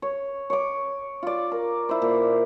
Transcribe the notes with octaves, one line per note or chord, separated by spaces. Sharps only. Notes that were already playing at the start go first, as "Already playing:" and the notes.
C#5
C#5 D6
F4 D5
A#4
E4 C5
A#2